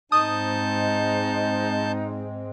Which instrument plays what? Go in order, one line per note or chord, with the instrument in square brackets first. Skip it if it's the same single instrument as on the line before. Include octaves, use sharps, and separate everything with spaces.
[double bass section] G#2 G#3 C4 [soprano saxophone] D#4 [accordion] A5 G6 [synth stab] D#6